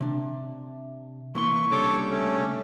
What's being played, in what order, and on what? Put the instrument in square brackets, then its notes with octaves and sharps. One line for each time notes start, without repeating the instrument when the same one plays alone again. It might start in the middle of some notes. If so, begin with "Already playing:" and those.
[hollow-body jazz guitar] C3 D4
[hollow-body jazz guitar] C2 A#3 C6 [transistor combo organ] E3 [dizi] C#6
[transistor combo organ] C#3 G3 D4 [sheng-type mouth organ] A4 C#5 D6
[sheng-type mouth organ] A3 C#4